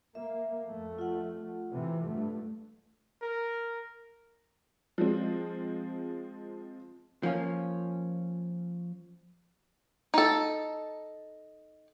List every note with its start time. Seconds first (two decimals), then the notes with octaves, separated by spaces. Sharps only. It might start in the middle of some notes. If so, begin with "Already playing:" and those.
0.15 A#3 E5
0.67 F2 A3
0.98 F4 F#5
1.71 C3 E3
2.06 G2 A3
3.22 A#4
4.98 F3 G#3 C4
7.23 F3 A#3 C#4
10.14 D#4 A4